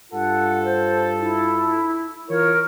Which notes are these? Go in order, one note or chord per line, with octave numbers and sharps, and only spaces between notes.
G2 F4 A4 F#5
C5
E4
E3 F4 A#4 C#5